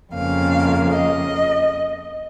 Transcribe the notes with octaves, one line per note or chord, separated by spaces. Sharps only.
F2 C#3 A#3 F5
D#5